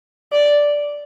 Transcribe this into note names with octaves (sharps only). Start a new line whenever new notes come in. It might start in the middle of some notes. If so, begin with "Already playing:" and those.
D5